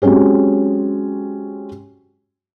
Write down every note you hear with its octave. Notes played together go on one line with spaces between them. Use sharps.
F#3 G#3 C4 C#4 G4